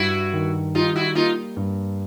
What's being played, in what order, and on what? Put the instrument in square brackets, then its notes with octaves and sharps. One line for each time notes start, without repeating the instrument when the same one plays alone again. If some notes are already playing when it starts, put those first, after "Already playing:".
Already playing: [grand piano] G2 [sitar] E4 F#4
[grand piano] D#3
[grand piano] G3 [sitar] D#4 F4
[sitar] E4 F#4
[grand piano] A#3 [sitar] D#4 F4
[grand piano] G2